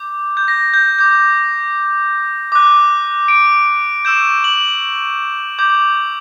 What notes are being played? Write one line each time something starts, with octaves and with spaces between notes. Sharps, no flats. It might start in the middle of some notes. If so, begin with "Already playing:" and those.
Already playing: D6 G6
G6
A#6
G6
D6 G6
D6 F#6
D7
C#6 E6 G6 E7
F#7
D6 G6